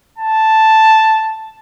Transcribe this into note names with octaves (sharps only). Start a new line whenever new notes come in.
A5